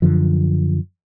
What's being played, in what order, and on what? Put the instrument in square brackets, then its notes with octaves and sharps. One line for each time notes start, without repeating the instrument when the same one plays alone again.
[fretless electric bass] F#2 D3 F3